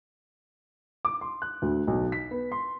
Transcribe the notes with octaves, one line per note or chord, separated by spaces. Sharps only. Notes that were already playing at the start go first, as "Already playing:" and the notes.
D6
C6
F#6
D2
B1
B6
B3
C6